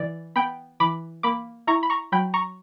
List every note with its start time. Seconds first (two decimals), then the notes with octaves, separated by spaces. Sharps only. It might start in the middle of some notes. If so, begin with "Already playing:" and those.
Already playing: E3 D5
0.36 B3 G5 B5
0.80 E3 B5 D6
1.23 A#3 B5 D6
1.67 E4 A#5 C#6
1.83 B5
1.90 A#5 C#6
2.12 F#3 G5 B5
2.34 A#5 C#6